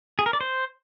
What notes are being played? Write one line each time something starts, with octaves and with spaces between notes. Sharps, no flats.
G#4
A#4
D5
C5